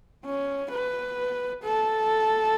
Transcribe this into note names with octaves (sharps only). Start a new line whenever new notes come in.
C#4
B4
A4